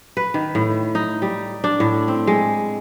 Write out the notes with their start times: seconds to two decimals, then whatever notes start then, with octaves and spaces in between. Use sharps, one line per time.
0.17 B4
0.34 D#3
0.55 A2
0.95 D#4
1.22 G3
1.64 D4
1.80 A2
2.08 C4
2.27 G#3